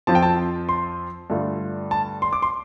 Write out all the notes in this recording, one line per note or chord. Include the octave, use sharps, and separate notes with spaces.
F2 F3 C4 F4 A5
G5
A5
C6
G2 D3 A3 F4
A5
C6
D6
C6